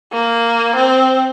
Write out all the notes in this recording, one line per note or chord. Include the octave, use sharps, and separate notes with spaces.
A#3
C4